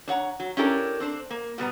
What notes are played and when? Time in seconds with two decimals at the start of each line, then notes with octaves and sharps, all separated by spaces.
0.08 D4 C#5 F#5 A#5
0.40 F#3
0.57 C#4 D4 E4 G4 A4 A#4
1.00 C4 D4 C5
1.31 A#3
1.58 B2 G3 B3 A#5